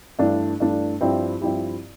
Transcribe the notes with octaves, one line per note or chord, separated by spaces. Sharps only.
G2 E3 A3 D4
G2 E3 A3 D4
G2 F3 C4 E4 G4
G2 F3 C4 E4 G4